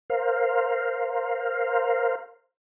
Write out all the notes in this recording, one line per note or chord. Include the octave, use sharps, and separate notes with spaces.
A#4 C5 F5